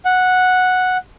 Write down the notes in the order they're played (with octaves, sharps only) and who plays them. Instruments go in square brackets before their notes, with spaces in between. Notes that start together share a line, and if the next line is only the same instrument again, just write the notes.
[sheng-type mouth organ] F#5